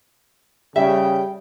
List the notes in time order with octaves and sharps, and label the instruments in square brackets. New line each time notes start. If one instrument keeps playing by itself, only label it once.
[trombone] C#3 [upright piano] G3 [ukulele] E5 [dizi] G5